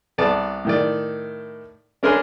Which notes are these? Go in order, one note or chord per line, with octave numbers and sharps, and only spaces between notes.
C2 B3 D5 A5
A2 D#3 D5
C#4 D4 A#4 B4 G#5 C6